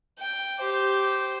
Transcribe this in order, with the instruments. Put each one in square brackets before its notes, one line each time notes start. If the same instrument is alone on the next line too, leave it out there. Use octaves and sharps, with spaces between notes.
[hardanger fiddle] G5
G4 C5